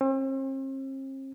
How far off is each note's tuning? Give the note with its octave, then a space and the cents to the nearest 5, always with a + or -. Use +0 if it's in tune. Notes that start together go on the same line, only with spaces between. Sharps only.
C4 +45